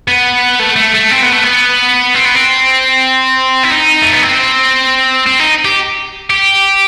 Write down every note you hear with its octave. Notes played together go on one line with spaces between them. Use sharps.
B3
A3
A3
A3
C4
B3
A3
B3
C4
B3
C4
E4
D#4
A3
B3
C4
C4
D#4
G4
G4